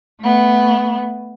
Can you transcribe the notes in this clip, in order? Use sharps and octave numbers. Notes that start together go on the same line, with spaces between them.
A3 B3